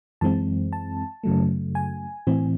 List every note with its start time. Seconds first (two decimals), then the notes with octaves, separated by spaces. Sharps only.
0.21 F#2 E3 G#3 C4 A5
0.73 A5
1.24 F#2 C#3 F#3 A3
1.75 G#5
2.27 A2 E3 C4